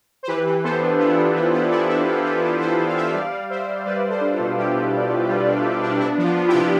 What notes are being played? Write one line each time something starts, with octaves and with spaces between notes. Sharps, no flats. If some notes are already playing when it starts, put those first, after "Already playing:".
C5
E3 G4 B4
E3
B3 A4 C5
D4
B3 F4
E4
D4 F4
E3
B3
E3 E4
D4 E4
D4 F4
E3 F4 A4
D4 G4 B4
E3 A4 C5
E3
F5
B3 C5 E5
G3 D5 F5
G3
G3 C5 E5
G3
G3 B4 D5
G3
A4 C5
D4
F4 A4
B2
G3 E4 G4
B2
B2
B2
G3 F4
D4
G3
D4
B3 E4
F3
F4
B3
E4 G4
C3